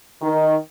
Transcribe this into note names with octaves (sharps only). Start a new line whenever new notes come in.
D#3